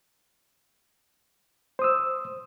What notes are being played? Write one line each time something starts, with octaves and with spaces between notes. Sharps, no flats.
C5 D#6 E6